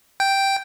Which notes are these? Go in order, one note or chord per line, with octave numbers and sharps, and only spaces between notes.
G5